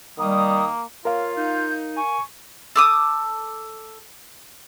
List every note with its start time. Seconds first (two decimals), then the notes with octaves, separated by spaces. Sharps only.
0.19 D#3 G3 A#3 D#6
1.05 F4 A#4 C#5 F5
1.36 D#4 G6
1.97 G#5 C#6
2.76 A4 D6 D#6